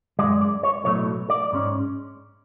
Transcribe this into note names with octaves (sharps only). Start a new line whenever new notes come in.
F#2 C#3 G#3 D5
D5
C#5
B1 A2 F#3 A3 C#5
D5
G#2 G#3 C#4